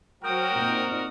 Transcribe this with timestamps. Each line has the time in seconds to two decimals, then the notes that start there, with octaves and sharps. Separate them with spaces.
0.24 F#3 F#4 A#4 C5 G5 D#6
0.58 A#2 C4 D#4